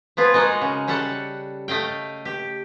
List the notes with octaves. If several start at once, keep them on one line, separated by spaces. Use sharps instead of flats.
F3 B3 F4 G#4
G#3 D#4 F#4 A#4
C#3
C#3 G3 A4 F#5
A3 D#5 F5 G5
G4